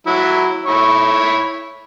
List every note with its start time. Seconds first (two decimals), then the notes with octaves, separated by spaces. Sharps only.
0.07 F#3 E4
0.66 E4 C#5